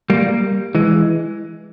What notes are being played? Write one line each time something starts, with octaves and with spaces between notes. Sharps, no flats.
G3 A#3
E3 G#3